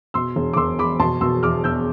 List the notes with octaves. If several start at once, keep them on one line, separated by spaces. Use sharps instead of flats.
B2 C6 E6
E1
D6
E1 C6 E6
E2 B5 D6
B2 A5 C6
B2 C6 E6
E2 D6 F6
E1 E6 G6